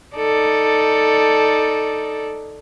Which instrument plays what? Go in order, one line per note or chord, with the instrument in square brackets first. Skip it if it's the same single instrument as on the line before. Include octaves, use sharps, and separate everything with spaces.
[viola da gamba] D#4 A4 D5